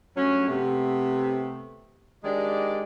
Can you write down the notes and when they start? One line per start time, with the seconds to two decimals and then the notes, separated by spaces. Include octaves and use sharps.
0.15 G2 F#3 A3 C#4
0.48 C3 A3 B3
2.23 D#3 G#3 D4 D#4 G4 D5